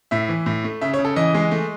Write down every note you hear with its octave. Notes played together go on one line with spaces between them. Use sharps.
A2 E5
E3
A2
A3
C#3 E5
C#5
C#3
A4
E3 D#5
G#3
A3